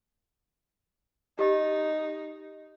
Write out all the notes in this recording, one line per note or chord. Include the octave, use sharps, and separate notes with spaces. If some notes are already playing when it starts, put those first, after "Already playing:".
D#4 G4 D#5